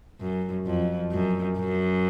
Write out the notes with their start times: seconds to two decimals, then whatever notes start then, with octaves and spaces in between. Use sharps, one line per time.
0.20 F#2
0.66 F2
1.12 F#2
1.58 F#2